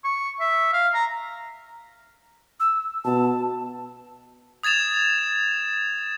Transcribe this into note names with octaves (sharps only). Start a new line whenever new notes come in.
C#6
E5
F5
A#5
E6
B2 A5
D#6 G#6 A6 E7 F7